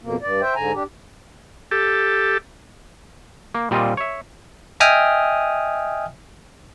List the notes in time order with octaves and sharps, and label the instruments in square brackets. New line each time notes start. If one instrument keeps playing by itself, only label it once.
[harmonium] F2 B2 A#3
G2 D5
C5 E5 G5
G#2 D3 G#5 A#5
D4 G4
[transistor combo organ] G4 A4
[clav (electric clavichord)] A#3
A#2 G3 C4 F4 D#5
C#5 E5
[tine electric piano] D#5 E5 G5 G#5 D#6 F6